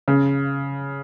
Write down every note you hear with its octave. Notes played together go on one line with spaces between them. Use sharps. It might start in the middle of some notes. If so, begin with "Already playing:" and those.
C#3